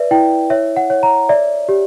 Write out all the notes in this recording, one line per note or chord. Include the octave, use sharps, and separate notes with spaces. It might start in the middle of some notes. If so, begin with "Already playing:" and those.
Already playing: B4 D5 E5
E4 G5
C#5 E5
F#5
C#5
A#5
D5 E5
G4